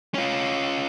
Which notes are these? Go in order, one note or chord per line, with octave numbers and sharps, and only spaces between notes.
C#4 F4